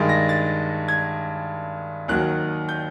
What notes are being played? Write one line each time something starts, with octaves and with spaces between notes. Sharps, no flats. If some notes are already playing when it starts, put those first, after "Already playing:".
Already playing: G2 D#3 G#3 A6
A#6
A6
G#6
D#2 D#3 F#3 F#6
G6